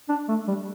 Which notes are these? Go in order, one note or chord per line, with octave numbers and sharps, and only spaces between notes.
D4
A3
G3